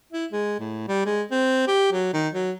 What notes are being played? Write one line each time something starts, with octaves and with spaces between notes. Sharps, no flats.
E4
G#3
A2
G3
G#3
C4
G4
F#3
D#3
F#3